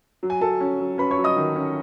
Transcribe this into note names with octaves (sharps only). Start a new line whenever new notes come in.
F#3
G#5
F#3 A4 A5
C#4
F#3
C#4 B4 B5
C#5 C#6
F#3
D#5 D#6
D#3
C#4